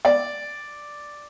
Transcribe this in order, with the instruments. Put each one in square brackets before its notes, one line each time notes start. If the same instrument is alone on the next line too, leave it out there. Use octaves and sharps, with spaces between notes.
[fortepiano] D5